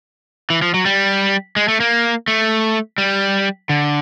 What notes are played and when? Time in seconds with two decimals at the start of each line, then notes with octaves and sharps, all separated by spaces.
0.50 E3
0.62 F3
0.74 F#3
0.86 G3
1.56 G#3
1.68 A3
1.80 A#3
2.28 A3
2.98 G3
3.69 D3